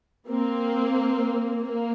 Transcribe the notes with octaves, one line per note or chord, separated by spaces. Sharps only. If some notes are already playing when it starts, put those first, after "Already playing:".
A#3 C4
A#3